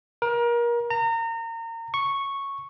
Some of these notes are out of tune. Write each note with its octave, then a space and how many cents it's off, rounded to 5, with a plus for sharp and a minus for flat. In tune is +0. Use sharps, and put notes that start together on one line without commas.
A#4 +30
A#5 -30
C#6 -5